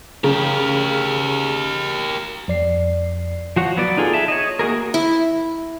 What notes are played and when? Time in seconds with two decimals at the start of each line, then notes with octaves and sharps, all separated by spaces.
0.24 C#3 G4 A#4
2.48 F2 D5 C7
3.56 F3 F#4 C#5
3.76 F#3 B3 D5
3.97 D#4 F4 G#4 A4
4.14 G#4 E5 A5
4.28 C#5 D#5
4.59 A#3 F#4 G#4 A#4
4.94 E4